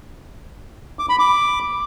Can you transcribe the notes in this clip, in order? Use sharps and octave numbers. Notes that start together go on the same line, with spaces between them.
D6
B5
D6